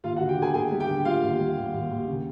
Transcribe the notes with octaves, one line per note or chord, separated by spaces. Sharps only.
D#2 F4 F5
F#4 F#5
D3
G4 G5
D3 G#4 G#5
D#2 G#4 G#5
G3
G4 G5
D3
G3 F4 F5
D#2
G3
D#2
D#2
D#2
C#3